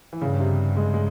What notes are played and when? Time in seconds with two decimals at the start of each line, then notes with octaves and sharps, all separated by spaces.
0.13 E3
0.21 G2 C#3
0.40 C3
0.77 G#3
0.94 G#3